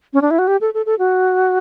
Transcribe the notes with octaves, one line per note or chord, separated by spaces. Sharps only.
C#4
D4
E4
F#4
G4
A4
A4
A4
F#4